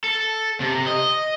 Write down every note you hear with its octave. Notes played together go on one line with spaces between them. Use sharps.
A4
C3
D#5